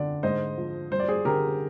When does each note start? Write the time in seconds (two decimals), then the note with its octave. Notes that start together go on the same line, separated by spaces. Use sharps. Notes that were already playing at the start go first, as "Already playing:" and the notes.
Already playing: D3 D5
0.23 G#2 C5 D#5
0.58 F3
0.91 G2 C5
1.00 D5
1.08 G#4 C5
1.25 D3 G4 A#4